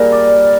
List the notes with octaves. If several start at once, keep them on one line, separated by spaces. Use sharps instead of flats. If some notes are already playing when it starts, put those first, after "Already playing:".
Already playing: A#2 G3 G#4 A#4
D5